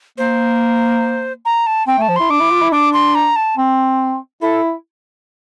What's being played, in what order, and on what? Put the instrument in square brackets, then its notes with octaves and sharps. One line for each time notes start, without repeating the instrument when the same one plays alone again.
[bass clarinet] A#3 [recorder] C5
[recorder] A#5
A5
[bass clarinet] C4 [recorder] G5
[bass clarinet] A3
[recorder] A5
[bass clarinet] F3
[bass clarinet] E4 [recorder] C6
[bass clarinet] D4 [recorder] D6
[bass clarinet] E4
F4
E4
[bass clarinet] D4 [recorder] D6
[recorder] C6
A#5
A5
[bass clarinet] C4
[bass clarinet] E4 [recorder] A4